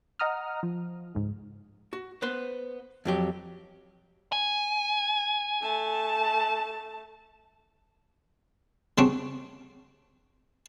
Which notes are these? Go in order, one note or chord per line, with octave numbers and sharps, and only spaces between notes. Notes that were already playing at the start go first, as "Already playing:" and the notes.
D#5 F#5 A#5 D#6 F6
F3
C#2 G#2
F#4
B3 B4 C5 C6
F2 F#3 G4
G#5
A3 A5
C#3 G3 C4 D4 F#4